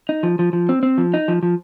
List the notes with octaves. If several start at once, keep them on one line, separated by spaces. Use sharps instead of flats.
D#4
F3
F3
F3
C4
C4
F3
D#4
F3
F3